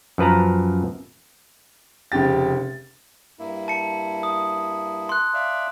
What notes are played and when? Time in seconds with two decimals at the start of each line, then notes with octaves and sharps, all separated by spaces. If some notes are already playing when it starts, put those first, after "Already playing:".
0.18 F#2 F3 B4 A5 A#5
2.12 F1 C#3 G4 A6
3.39 G2 A#3 E4
3.68 A5 C#7
4.23 D#6
5.09 C6 F#6
5.34 D5 E5 F5